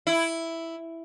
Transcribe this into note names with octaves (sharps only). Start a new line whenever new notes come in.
E4